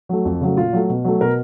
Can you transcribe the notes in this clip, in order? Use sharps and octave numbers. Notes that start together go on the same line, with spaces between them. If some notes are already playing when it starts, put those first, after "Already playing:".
F#3 A3
F2
C#3 F#3 A3
A#2 F4
F#3 A3
B2
F#3 A3
B2 A#4